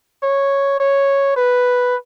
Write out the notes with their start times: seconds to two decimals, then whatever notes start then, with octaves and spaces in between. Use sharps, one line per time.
0.23 C#5
0.80 C#5
1.36 B4